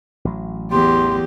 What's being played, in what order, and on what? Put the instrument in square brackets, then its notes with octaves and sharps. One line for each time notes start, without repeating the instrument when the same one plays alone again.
[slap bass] A1 F#3
[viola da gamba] E2 [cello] G4 [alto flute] C6